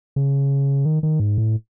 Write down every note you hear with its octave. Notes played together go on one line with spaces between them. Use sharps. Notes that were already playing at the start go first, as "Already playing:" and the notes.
C#3
D#3
D#3
G#2
A2